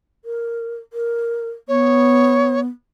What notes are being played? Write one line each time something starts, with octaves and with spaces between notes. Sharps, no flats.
A#4
A#4
B3 C#5